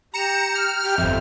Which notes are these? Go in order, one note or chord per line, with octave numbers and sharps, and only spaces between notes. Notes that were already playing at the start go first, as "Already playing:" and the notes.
G4 A#5 C#7 E7
F6
G4
G1 F2 E5